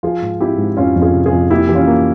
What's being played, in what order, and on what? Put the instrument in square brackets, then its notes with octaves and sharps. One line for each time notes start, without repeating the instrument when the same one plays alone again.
[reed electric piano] F3 [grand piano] F4 G#4
[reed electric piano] G#2
[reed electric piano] C4 [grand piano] E4 G4
[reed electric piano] G#2
[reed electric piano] F2 [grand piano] C#4 F4
[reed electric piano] F2
[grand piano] F4 G#4
[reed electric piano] C3
[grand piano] F4 G#4
[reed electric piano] F2
[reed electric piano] A#3 [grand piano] E4 G4
[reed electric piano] E3 [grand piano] G4
[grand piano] C#4 F4
[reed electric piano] A#3